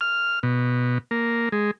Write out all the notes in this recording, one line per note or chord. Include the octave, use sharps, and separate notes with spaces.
F6
B2
A#3
G#3